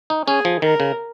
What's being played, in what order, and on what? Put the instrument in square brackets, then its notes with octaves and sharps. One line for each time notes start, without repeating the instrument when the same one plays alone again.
[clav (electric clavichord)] D#4
[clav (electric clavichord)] C#4 [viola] G#4
[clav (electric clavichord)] F3
[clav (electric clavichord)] D#3 [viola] A#4
[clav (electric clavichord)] C#3